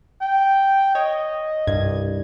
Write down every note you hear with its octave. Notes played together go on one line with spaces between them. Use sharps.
G5
C#5 D#5
C2 G2 G#6